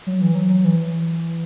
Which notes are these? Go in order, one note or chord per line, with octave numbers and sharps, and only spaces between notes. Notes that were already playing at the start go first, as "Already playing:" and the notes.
F#3
E3
F#3
F#3
E3